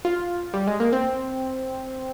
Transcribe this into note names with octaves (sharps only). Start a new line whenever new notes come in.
F4
G3
G#3
A#3
C4